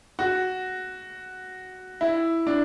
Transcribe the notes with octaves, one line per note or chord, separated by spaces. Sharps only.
F#4
E4
D4